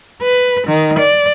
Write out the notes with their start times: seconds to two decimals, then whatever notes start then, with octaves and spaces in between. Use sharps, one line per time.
0.22 B4
0.68 D#3
0.99 D5